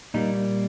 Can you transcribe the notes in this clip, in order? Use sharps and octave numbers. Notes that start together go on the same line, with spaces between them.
A#2 G3 A#3 D#4